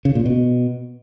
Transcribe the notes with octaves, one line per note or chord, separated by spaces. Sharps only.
C#3
A#2
B2